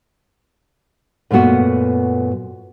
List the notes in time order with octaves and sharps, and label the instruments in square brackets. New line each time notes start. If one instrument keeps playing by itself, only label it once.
[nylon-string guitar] F#2 A#2 A3 B3 F#4